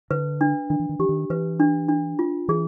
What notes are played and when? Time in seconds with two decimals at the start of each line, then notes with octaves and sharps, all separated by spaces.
0.10 D3 B4
0.41 D4
0.70 D#3 D4
0.79 E3
0.89 D#3
0.99 E3 G4
1.09 D#3
1.30 E3 B4
1.60 D4
1.89 D4
2.19 F4
2.48 E3 G#4